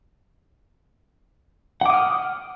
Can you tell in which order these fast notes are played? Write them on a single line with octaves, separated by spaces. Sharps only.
F#5 D6 D#6 F6